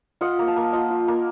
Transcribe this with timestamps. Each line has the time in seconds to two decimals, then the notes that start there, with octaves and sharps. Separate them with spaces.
0.21 F4 D#5 F#5
0.39 A#3
0.47 F5 A5
0.56 A#3
0.73 F4 D#5 F#5
0.91 F4
1.08 A#3